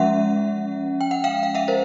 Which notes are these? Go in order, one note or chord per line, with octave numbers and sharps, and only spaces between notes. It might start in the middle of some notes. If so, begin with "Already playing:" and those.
Already playing: F3 G#3 C#4 E5 F#5
G5
F#5
F5 G5
F5
E5 F#5
A#4 C5